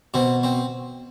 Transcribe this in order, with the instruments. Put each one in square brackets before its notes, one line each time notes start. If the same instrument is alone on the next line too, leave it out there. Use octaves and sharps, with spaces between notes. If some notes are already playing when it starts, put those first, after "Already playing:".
[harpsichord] B2 C4
C4